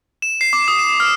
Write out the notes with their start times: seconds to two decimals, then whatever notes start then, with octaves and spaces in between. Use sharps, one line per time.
0.22 E7
0.41 C7
0.53 D6
0.68 D#6
0.79 E7
1.00 F6